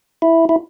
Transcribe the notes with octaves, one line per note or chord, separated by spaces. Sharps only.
E4
E4